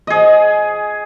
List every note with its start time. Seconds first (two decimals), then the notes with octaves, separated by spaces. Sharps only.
0.07 G#4 D#5